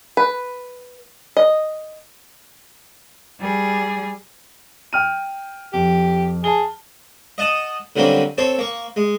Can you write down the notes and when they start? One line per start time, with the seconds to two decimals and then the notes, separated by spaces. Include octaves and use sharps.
0.17 B4
1.37 D#5
3.40 G3 G#4
4.93 G5 F6 D#7
5.73 F2 G4
6.44 G#4 A5 G7
7.38 D#5 F#5 A5 D#6
7.96 D3 F#3 G3 A#3 C4 C#4
8.38 C4 A4 C5 C#5
8.58 A#3 C#6
8.96 G#3